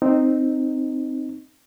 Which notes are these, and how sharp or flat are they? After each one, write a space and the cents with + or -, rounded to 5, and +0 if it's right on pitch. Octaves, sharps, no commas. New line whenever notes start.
C4 +0 D#4 -10